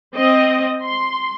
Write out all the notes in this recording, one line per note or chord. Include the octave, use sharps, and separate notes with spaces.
C4 D#5
C6